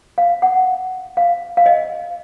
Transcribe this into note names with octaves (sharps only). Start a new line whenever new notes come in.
F5
F#5
F5
F5
D#5